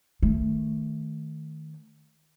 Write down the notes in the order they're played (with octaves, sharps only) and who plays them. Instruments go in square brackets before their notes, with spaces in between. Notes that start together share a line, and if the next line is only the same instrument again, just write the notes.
[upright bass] D#3 A3